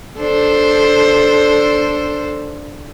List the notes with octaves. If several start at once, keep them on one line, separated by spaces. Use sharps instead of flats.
D4 A4 C5